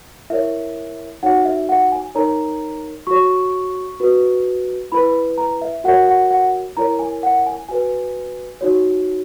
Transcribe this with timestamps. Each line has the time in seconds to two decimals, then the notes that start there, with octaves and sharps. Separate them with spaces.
0.30 E4 A#4 C#5 E5
1.23 D#4 F#4 C#5 F#5
1.45 E5
1.69 F#5
1.92 G#5
2.15 D#4 A#4 C#5 A#5
3.07 F#4 C#5 C#6
4.00 F#4 B4
4.92 E4 B4 B5
5.38 A#5
5.62 E5
5.84 F#4 A#4 C#5 F#5
6.08 F#5
6.30 F#5
6.77 E4 A#4 C#5 A#5
6.99 G#5
7.23 F#5
7.46 G#5
7.69 F#4 B4 G#5
8.61 D#4 F#4 C#5